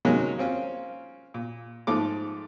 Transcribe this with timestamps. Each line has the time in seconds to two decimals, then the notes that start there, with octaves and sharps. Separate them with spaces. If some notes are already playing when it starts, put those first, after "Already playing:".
0.05 C3 D#3 F#3 G#3 A#3 C#4
0.38 A#3 C4 C#4 F4
1.34 A#2
1.87 G#2 F3 A3 D6